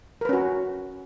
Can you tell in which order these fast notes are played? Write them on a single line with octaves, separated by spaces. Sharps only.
A#4 B4 C#4 F#4